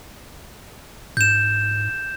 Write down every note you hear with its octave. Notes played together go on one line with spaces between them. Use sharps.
G#2 G6 E7